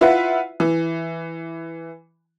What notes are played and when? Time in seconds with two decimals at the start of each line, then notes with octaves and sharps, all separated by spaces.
0.01 E4 F4 B4 E5 F#5
0.60 E3